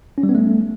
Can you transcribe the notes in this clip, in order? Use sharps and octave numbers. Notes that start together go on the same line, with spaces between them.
C#4
G3
B3
A3